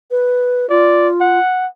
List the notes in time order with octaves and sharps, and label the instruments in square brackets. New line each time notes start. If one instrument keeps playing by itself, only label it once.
[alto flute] B4
[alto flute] F4 [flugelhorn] D5
[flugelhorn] F#5